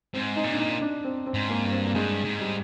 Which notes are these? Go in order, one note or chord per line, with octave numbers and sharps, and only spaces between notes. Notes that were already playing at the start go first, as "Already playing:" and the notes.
G#2 C4
D#4
A#2
D4
D#4
D4
C4
C4
G#2
A#3
G2
C4
A#3
G2 G#3
G#2
G3